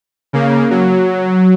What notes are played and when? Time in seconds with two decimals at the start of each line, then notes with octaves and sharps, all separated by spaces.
0.33 C#3 A#3
0.71 F#3